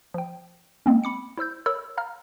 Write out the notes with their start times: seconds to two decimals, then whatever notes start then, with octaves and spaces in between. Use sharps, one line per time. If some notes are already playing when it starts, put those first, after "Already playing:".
0.14 F3 G5
0.86 G#3 A#3 C4 C#4
1.04 B5 D6 C#7
1.38 E4 C5 E6 G6
1.66 A#4 C#5 B5 E6
1.97 F5 A#5 F6